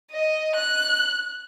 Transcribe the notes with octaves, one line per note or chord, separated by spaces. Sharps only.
D#5
F#6